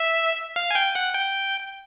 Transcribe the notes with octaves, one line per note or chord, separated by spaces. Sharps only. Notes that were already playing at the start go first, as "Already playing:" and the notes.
Already playing: E5
F5
G#5
G5
F#5
G5